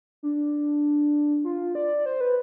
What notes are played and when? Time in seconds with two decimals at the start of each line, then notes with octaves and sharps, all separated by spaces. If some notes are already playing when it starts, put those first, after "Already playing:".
0.23 D4
1.45 F4
1.75 D5
2.06 C5
2.21 B4